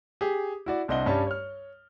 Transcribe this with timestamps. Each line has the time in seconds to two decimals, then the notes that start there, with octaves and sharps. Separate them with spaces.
0.21 G4 G#4
0.66 E4 F#4 D5
0.88 C2 C4 D4 D#5 F#5 G7
1.06 G2 G3 C#4 A5
1.27 C#5 F6